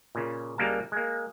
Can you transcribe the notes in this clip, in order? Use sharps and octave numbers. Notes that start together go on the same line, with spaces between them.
A#2 C#3
C#2 G3 G#3 A#3 A#4 A5
G#3 A#3